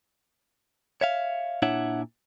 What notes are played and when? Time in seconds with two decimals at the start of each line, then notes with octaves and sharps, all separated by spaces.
1.01 C#5 E5 F5
1.62 A#2 D4 E4 C#5 E5 F#5